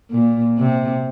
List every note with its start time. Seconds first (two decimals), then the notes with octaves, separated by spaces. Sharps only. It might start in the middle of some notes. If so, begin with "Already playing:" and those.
0.11 A#2
0.58 C3